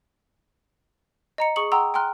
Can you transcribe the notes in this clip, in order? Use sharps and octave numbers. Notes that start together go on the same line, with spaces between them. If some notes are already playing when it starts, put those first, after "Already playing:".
D#5 A#5 C#7
G#4 C#6 D#6 C#7 F#7
F#5 G5 A#5 C6 D#6 E6
G5 G#5 A#5 C6 F6 F#6